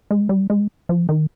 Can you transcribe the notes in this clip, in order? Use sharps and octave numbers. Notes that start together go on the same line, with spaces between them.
G#3
G3
G#3
F3
D#3